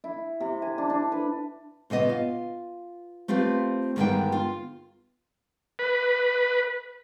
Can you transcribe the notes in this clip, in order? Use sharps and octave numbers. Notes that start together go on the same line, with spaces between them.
E4
C3
G#5
D4
D4
B4
A#2 C#3 B3 D#5
F4
A3 C4 F4 G4 B4
G2 D3 D#3 G#3 B3 G5
F4
B4